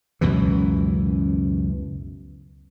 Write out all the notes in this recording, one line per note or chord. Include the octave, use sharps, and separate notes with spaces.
C#2 F#2 B2 E3